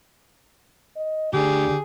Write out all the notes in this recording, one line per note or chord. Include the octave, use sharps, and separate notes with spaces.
D#5
D2 D4 G4 G#4